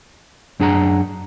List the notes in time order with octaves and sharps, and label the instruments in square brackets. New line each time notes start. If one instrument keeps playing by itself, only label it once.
[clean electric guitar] F#2 D4 G#4 F#5 A#5